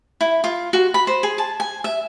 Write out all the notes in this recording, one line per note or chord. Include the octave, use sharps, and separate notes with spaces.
E4
F4
F#4
B5
C5
G#4
A5
G#5
E5